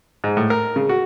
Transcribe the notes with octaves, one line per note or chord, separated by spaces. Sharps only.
G#2
A2
A#4
C#3
F#4